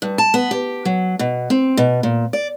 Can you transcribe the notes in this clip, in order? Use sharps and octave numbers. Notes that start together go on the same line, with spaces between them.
G2
A5
B3
G4
F#3
B2
C4
B2
A#2
D5